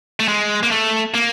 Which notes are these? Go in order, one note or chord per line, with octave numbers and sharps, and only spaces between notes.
A3
G#3
A#3
A3
A#3